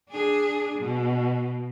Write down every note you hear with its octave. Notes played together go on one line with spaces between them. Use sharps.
D4 G#4
B2